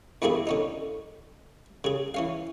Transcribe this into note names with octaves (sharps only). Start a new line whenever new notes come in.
E2 G2 A#3 C4 E4 G#4
D3 C#4 D#4
C#3 G#4
E3 C#4 F5